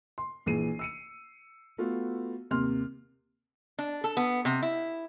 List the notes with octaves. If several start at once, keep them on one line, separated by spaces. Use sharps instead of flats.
C6
A#1 E3 G#4 C7 D#7
E6 C#7 D#7
A3 B3 F4 F#4
D#2 C3 C6 F6
D4
A4
B3
C3
E4